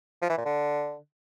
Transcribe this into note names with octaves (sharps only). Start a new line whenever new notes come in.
F3
E3
A#2
D3